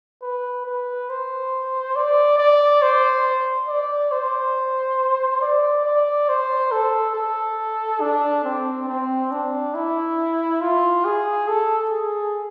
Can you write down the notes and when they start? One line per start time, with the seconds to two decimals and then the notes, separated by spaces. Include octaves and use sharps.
0.22 B4
0.66 B4
1.09 C5
1.96 D5
2.38 D5
2.82 C5
3.68 D5
4.12 C5
5.42 D5
5.85 D5
6.29 C5
6.72 A4
7.15 A4
8.01 D4
8.44 C4
8.88 C4
9.31 D4
9.74 E4
10.62 F4
11.05 G#4
11.48 A4
11.91 G#4